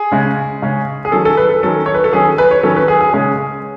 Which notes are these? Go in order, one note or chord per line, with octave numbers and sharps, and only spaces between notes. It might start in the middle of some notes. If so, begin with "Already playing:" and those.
Already playing: G#4
C#3 G#3 C#4
C#3 G#3 C#4
G#4
D#3 F#3 C#4 A4
A4
B4
A4
D#3 F#3 C#4 A4
C#5
B4
A4
D#3 F#3 C#4 G#4
B4
C#5
D#3 F#3 C#4 A4
B4
G#4
G#4
C#3 G#3 C#4 G#4